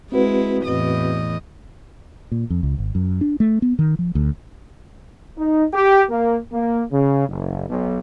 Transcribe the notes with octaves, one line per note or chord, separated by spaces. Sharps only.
G#3 C4 E4 F#4 B4
E2 A2 D#5
A#2
F2
C#2
G#1
F#2
D4
A3
B3
D#3
F3
D2
D#4
G4
A#3
A#3
C#3
F#1
B1